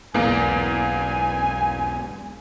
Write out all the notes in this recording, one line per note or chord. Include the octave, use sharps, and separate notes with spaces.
B1 E2 G#2 A#3 G#5